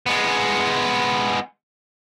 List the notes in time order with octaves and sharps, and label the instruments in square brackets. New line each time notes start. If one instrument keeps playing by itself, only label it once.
[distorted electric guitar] G#3 B3